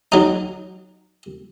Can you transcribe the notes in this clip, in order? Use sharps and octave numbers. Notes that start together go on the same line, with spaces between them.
F#3 D#4